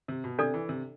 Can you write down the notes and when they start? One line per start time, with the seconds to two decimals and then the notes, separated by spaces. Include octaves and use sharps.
0.08 C3
0.24 B2
0.39 C3 D4 A4 D5
0.54 E3
0.69 C3